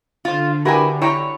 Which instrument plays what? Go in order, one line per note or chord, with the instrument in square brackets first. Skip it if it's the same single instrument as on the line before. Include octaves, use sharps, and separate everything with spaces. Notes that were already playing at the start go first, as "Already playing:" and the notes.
[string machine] D3 [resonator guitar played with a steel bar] F4 C5
[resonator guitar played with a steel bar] E4 A#4 B4 [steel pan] F#4 G4 G#5
[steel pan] E4 G5 A#5 [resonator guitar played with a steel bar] C#5